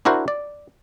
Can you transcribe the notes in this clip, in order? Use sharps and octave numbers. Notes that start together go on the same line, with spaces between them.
D4 E4 F#4 A#4 C5
D5